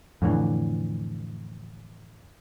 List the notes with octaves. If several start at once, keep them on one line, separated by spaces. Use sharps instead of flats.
F2 A2 D3 E3